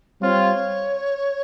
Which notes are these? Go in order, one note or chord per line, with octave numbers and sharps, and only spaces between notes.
G3 C4 F4 C#5